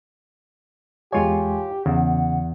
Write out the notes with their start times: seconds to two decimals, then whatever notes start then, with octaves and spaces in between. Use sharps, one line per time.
1.12 E2 G#3 F4 G4 C#5 G#5
1.86 E2 C#3 F#5